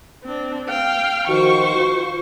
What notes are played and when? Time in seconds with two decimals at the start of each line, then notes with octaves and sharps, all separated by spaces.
0.24 C4 D4
0.68 F5 G5
1.28 D#3 F3 F#4 C5 C#6
1.77 F4